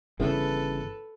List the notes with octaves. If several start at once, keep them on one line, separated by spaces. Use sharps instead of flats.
G1 C#3 E3 A4 B4